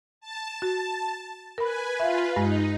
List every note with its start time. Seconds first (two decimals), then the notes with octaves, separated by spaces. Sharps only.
0.21 A5
0.62 F#4
1.58 A#4 B4 G#5 B5
2.00 F4 B4 E5 F5
2.36 G2 G#3 D#4 F4